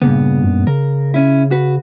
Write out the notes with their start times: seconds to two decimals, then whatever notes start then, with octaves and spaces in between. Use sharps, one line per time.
0.02 G2 A#2 C#3 B3
0.44 F#2
0.67 C#3 A#4
1.14 C#4 E4
1.51 F#4 B4